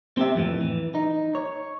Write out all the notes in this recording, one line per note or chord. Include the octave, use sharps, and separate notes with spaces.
C4 G4 E5
F2 A2 E3
E3
D#4
C#5